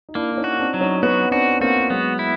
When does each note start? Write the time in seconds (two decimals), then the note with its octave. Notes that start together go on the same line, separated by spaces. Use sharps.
0.09 D#4
0.15 A#3 D4 E4
0.32 E4
0.37 C#4 D#4
0.44 F#4
0.59 C4 D4
0.74 F#3
0.80 C#4 D#4
1.03 B3 C#4 F#4
1.32 C4 D4 F#4
1.61 A#3 C4 F#4
1.90 F#3 G#3 B3
2.19 E4